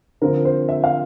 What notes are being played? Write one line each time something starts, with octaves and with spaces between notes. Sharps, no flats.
D3 F3 C4 F4 A#4
C5
E5
F5